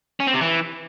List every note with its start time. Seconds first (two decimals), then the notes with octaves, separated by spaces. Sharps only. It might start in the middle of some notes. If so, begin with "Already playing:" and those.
0.20 C#4
0.27 C4
0.34 C3
0.41 E3